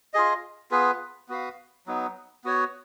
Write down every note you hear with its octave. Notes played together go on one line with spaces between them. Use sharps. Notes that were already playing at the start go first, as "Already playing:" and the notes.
F4 G#4 D#5
B3 F4 G#4 B4
B3 F#4 B4 F5
F#3 B3 D#4
B3 F#4 C#5